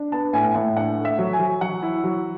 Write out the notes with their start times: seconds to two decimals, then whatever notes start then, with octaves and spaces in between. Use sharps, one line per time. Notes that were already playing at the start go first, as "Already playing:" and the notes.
Already playing: D4
0.12 B3 A5
0.33 A2 G#5
0.55 A2 F#5
0.76 D4 F#5
0.98 A3
1.05 E5
1.19 F#3
1.33 G#5
1.39 F#3
1.61 F#3 F#5
1.83 E4
2.04 F#3